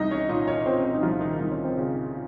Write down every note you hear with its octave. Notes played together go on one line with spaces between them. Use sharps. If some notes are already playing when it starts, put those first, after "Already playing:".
Already playing: C2 D#4 D#5
C#4 C#5
A#2 D#4 D#5
C#4 C#5
A#2 C4 C5
C4 C5
D#4
C2 F3 F4
D#3 D#4
C2 D#4
C#4
C4
A#2 C#3 C#4
A#2